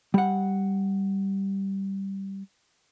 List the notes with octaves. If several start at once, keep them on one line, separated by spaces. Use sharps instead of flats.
G3 F#5